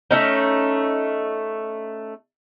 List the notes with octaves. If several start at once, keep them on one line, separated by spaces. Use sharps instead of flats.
A3 C#4 D#4